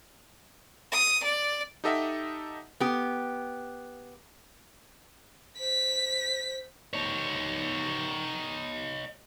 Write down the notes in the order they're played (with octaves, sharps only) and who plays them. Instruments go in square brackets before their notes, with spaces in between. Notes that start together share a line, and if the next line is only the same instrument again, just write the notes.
[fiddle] D#6
D5
[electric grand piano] D#4 G4 A4 D#5 E5 F#5
[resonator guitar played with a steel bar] B3 G4
[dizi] C5 [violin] B6
[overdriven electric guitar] D#4 C#5